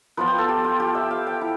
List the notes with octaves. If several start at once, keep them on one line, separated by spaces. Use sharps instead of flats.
F3 B3 F4 B4
G5
A4
G4
F4
G4
E5
F5
G5
E4